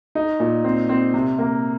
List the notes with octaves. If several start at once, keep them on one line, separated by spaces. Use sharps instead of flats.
D#4
A#2
C4
C4
C3
A#3